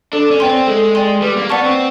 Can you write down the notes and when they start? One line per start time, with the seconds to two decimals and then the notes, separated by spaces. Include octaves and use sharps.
0.13 D4 A4
0.31 C#4
0.40 B3 D5 G5 C6
0.49 C4
0.67 G#3 A4
0.95 D5 G5 C6
1.22 G3 B4
1.36 A#3
1.50 B3 D5 F#5 A5 C#6
1.64 C4